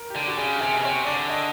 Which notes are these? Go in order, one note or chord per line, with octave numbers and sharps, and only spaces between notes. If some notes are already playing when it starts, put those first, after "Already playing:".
Already playing: A#4
G4
D3
F#4
C#3 G#4
G4
C3 G#4
B2
C3 C#5
D3 D5
D#5